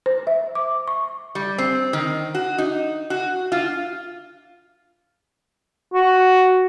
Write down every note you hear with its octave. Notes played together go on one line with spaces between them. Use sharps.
C5
E5
D6
C#6
G3
C4
D#3
F#4
D#4
F#4
F4
F#4